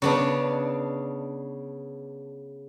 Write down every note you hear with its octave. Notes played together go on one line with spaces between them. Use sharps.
C#3 B3 D4